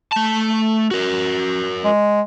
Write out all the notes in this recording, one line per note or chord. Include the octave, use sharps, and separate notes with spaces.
A3 A5
F#4 A#4
G#3